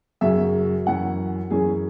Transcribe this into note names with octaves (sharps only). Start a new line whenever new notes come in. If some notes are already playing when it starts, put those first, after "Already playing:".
F#2 C#3 F#3 C#4 E5
F#2 E3 C#4 F#5
F#2 E3 C#4 G#4